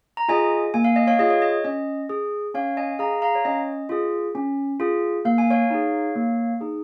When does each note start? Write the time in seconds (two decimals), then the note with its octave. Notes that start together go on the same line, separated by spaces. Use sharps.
0.17 A#5
0.28 F4 G#4 D#5 G#5
0.74 A#3 G#5
0.84 F5
0.96 D#5
1.07 C#5 F5
1.19 F4 G#4 D#5
1.30 C#5
1.42 D#5
1.64 C#4 D#5
2.09 G#4
2.54 C#4 C#5 F5
2.77 D#5 G#5
2.99 G#4 F5 A#5
3.22 F5 A#5
3.35 C#5
3.45 C#4 D#5
3.89 F4 G#4
4.35 C#4
4.80 F4 G#4
5.25 A#3 F5
5.38 G#5
5.50 C#5 F5
5.70 D#4 G#4
6.15 A#3
6.61 D#4 G#4